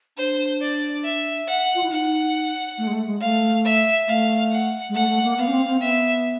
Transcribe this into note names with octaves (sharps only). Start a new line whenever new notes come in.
D4 C5
D5
E5
F#5
F4
E4
D#4 F#5
A3
G#3
A3
G#3
A3 F5
E5
A3 F5
F#5
G#3
A3 F#5
A3
A#3
B3 F5
C#4
C4
C4
B3 E5